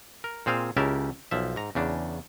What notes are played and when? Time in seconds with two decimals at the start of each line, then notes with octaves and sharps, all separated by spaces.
0.24 A#4
0.46 A#2 C4 G#4 C5 F5
0.77 C#2 C#3 E4 G4 A#4 A5
1.31 B1 F3 E5
1.56 G#2 A#5
1.75 E2 C#3 D4